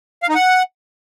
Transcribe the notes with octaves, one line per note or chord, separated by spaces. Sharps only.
F5
D#4
F#5